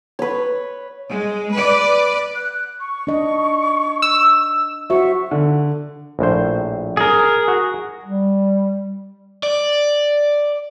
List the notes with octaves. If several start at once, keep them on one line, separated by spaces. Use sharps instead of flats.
B4 C#5
G#3
B4 D5
F#6
C#6
D4 D#5
E6
F#4 C5 E5 C#6
D3
A#1 A2 C5
G#4 A#4
F#4
G3
D5